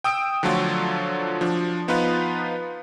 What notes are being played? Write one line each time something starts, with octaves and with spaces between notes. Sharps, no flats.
G5 D#6 E6 D7
D3 F3 F#3 A3 F4 F#4
F3 D4
F3 B3 D#4 F4 B4 F5